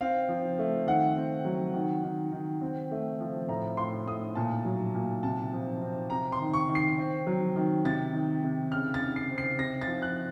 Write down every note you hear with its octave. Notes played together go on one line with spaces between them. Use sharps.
C4 F5
F3
A3
D#3 F#5
C4
F#3
D#3
D#3
D#3
C4
A3
F3
A2 A#5
A2 C6
A2 D#6
A#2 A5
F#3
A#2
C3 A5
F3
C4
C3 A#5
C6
D#3
C#6
D#3
C7
C4
F#3
D#3
C3 A6
D#3
C3
C#3 F6
A6
C#3
C7
C4
C7
C3 A#6
A6
F3
F#6